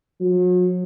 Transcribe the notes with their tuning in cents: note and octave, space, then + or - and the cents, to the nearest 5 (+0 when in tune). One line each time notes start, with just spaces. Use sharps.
F#3 -40